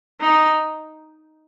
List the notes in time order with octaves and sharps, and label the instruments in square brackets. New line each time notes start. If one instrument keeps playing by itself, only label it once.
[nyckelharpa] D#4